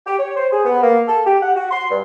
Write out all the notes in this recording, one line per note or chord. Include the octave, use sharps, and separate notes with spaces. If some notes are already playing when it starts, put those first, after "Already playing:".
G4
C#5
C5
G#4
B3
A#3
A4
G4
F#5
F#4
C6
G2